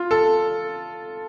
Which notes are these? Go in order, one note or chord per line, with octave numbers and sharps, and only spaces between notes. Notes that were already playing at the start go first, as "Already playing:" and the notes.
Already playing: F4
A4